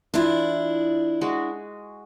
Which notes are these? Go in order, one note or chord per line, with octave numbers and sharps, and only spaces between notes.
E3 D4 E4 F4
G#3 F#4